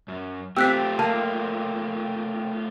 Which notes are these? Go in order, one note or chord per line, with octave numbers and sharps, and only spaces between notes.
F#2
A3 C4 F4 G4 G5 E6 F#6 B6
A#3 A5